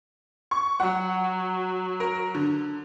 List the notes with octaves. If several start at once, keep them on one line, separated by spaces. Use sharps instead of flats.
C#6
F#3 F#5
A#4
D3